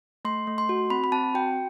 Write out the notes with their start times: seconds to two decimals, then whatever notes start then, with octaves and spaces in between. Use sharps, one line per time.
0.25 A3 C6
0.47 A3
0.58 C6
0.69 F#4
0.90 C4 B5
1.04 B5
1.12 C4 A5
1.34 F#4 G5